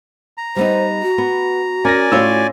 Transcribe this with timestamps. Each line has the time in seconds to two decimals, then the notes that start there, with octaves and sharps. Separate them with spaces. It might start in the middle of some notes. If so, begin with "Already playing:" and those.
0.38 A#5
0.56 G3 B3 D#4 C5
1.02 F#4
1.18 B3
1.85 C#4 A#4 D5 G#5 A#6
2.12 A2 C#4 F4 C#5 E6